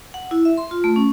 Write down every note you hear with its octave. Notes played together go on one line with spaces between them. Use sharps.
F#5
E4
E5
C6
F4
A3
C#4